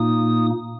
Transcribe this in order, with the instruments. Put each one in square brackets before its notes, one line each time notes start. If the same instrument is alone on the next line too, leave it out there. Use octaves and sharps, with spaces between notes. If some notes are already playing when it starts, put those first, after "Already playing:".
Already playing: [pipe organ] A#2 A#3 D#4 D#6